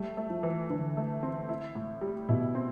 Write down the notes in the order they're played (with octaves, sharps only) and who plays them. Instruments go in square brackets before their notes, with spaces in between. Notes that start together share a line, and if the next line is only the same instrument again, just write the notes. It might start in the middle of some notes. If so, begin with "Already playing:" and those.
Already playing: [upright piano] G3 [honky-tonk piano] A3
[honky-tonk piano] A3
[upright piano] F3
[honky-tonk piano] E3
[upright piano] D3 [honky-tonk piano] E3
[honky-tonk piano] A3
C4
E4
A2
G3
[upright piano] B2 [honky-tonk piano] E4
[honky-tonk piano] C4